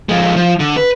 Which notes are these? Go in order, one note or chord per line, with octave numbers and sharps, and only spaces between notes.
F3 G#3
F3
D3
B4